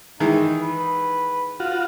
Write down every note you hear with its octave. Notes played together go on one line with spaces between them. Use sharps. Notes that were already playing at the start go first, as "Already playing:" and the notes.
D#3 E3 G#3 D#4
B4
F4 F#4